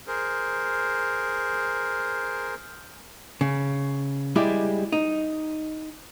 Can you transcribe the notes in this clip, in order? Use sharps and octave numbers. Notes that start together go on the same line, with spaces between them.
G#4 A#4 C5
C#3
G3 G#3 E4 G4
D#4